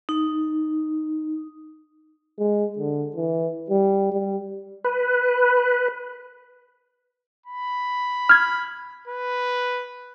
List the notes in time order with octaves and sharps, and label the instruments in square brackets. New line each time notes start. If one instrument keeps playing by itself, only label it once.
[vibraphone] D#4
[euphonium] G#3
D3
E3
G3
G3
[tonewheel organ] B4
[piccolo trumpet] B5
[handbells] F6 G#6
[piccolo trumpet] B4